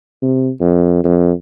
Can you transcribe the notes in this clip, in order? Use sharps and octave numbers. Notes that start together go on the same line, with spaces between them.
C3
F2
F2